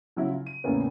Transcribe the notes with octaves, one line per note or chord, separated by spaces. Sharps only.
C#3 F#3 E4
F4
D#7
E2 A2 C#3 A#3 B3 C#4